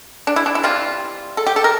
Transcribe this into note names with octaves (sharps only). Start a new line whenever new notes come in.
D4
E4
D4
E4
E3 G3 C4 F4
A4
G4
A4
A#4